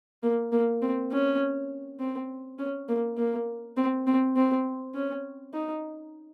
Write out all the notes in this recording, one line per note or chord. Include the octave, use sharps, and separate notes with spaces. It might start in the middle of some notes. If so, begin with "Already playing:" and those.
A#3
A#3
C4
C#4
C4
C#4
A#3
A#3
C4
C4
C4
C#4
D#4